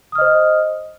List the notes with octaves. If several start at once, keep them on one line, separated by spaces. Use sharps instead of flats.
C5 D#5 D#6 F6